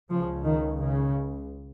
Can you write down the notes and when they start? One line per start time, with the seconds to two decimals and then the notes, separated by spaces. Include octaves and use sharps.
0.11 C#2 C#3 F3
0.45 D#3
0.80 C#3